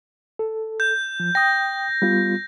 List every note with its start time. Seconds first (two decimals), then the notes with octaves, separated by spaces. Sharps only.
0.39 A4
0.80 G6
1.20 F3
1.35 G5 D#6 A#6
2.02 G3 B3 F4